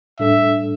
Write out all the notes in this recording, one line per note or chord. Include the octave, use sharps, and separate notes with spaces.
A2 G3 D4 A4 E5